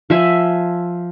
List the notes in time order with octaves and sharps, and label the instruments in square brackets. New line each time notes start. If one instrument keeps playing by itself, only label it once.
[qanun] F3 E5 G#5